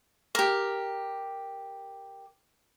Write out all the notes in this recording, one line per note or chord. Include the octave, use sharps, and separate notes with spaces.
G4 A#4